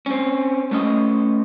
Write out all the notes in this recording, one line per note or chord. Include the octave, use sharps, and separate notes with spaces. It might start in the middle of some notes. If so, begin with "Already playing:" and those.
C4 C#4
A3 C#4 D#5